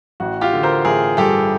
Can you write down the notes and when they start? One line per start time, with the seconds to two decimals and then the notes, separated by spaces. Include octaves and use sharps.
0.20 A1 F#4
0.41 F4 G4
0.53 D3
0.63 A#4 C5
0.85 A1 G#4 A#4
1.17 G2 G4 A4